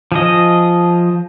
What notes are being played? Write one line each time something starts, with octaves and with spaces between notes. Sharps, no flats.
F3 G#4 D#5